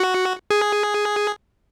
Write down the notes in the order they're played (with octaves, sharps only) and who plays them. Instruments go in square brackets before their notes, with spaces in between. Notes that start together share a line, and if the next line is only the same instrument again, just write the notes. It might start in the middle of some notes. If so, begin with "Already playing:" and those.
Already playing: [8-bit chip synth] F#4
G#4